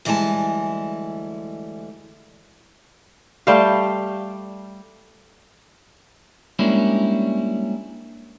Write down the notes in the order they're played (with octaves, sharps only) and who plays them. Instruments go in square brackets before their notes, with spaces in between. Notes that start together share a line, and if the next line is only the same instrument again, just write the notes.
[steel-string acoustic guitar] D2 E3 G3 G#3 G#5 A5
[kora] G3 A3 C5 F5
[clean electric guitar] G3 G#3 A#3 C#4 D4 E4